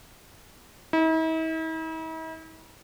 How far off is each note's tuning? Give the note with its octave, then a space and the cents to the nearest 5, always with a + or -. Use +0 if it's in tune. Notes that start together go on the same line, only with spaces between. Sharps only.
E4 -45